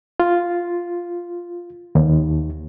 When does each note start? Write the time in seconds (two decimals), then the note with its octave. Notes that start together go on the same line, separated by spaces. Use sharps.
0.20 F4
1.95 D#2